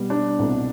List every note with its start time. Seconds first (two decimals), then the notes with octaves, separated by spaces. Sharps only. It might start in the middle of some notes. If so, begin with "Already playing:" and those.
Already playing: B2 G3 B3
0.10 D4
0.39 C2 B2 A3